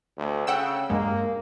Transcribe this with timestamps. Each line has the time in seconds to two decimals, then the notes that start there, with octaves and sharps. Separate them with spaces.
0.18 D2
0.47 C#3 F#5 G5 E6
0.90 G2 G#3 A#3